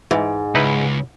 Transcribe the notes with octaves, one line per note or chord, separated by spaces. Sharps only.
G#2 E3
C#2 D#4 E4 B4